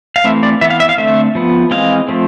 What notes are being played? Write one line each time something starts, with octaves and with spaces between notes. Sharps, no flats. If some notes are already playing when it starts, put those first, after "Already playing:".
F5
E3 A3 C4 E5
D5
E3 B3 E5
F5
E5
F5
D3 A3 C4 E5
F3 B3
E3 G#3 C4 F5
F3 A3 C4